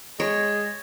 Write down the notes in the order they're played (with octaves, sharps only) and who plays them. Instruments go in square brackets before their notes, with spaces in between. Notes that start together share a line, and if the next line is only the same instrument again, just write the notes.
[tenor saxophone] G#3 [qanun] C#5